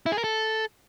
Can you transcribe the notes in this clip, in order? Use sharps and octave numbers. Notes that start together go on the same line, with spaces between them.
E4
G#4
A#4
A4